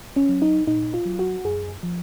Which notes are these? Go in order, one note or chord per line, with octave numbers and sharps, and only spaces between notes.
C#4
F#3
D#4
A#2 D#4
F4
F#3
F#4
F#2 G#4
F3